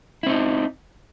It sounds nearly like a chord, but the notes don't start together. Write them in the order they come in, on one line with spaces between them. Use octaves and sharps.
E4 C4 D#4